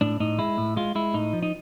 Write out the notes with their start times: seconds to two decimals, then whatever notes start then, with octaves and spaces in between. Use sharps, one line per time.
0.01 A2 D4
0.20 A2 D#4
0.39 G#3 E4
0.58 A2
0.76 G#3 F4
0.95 G#3 E4
1.14 A2 D#4
1.33 F3
1.43 D#4